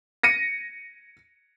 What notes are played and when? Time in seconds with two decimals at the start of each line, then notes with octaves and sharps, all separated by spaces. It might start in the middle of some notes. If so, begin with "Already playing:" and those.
0.23 A#6 C#7 D#7